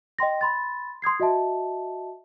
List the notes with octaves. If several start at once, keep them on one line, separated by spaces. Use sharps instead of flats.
D#5 G5 C6 A#6
B5 C6 A6
C6 D#6 G#6 C7
F#4 D#5 E5 A5